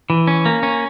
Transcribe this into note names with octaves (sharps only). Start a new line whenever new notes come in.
E3
C#4
A#3
C#4